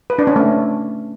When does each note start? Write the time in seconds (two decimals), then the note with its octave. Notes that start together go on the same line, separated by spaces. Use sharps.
0.10 B4
0.19 D4
0.27 C#4
0.36 A3